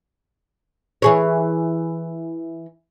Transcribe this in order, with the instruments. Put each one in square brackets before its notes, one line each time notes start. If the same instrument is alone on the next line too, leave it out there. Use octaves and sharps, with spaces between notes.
[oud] E3 G#4 C#5